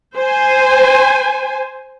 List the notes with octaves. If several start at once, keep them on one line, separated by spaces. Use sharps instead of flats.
C5 G#5